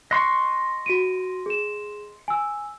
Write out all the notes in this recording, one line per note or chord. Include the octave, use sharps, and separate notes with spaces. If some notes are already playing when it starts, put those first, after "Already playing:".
D#5 C6 C#6 F#6 C7
F#4 D7 D#7
G#4 E7
G#5 E6